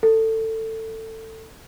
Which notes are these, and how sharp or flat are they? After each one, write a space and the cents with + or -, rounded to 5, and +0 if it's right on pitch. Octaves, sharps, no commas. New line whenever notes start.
A4 +20